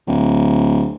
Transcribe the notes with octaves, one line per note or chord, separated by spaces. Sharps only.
D1